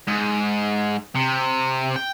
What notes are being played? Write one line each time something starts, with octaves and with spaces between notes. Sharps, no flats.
G#2
C3
G5